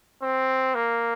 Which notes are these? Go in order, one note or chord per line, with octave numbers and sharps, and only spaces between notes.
C4
A#3